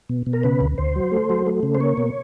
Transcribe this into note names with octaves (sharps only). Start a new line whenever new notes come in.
B2
B2
A#4
C#3 B4
D2
D2 C5
F#3
A3
F#3
A3
C#3
C5
A#3 C#5
B2